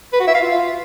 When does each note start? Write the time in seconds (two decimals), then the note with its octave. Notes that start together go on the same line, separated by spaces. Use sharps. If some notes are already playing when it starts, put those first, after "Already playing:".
0.13 B4
0.20 F#4
0.27 E5
0.35 F5
0.42 F4